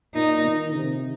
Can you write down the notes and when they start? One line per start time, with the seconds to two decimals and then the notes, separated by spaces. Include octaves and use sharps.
0.15 A#2 D#4
0.45 D#3
0.75 C3